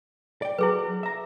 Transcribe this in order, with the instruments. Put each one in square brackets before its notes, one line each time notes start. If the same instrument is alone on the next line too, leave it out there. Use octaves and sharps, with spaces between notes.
[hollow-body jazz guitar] D5 G5
[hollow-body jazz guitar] F#3 F#4 [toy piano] E4 G#4 B4
[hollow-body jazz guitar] E5 A#5